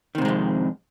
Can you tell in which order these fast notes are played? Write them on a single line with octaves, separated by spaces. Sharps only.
D#3 C3 G#2 G#3 F2